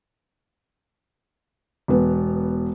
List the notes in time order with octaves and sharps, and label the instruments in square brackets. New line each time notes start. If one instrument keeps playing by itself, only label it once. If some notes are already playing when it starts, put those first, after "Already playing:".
[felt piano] E1 B3